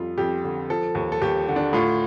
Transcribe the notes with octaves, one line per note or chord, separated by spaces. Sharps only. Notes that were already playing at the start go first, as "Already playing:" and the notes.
Already playing: F2 G3 F4
F2 G4
D3
F3 A4
D#2
A4
D#2 G4
D3
D4
A2 F4